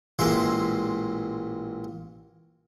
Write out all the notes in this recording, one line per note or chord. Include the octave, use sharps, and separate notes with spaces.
A1 A#2 G#3 E5 C6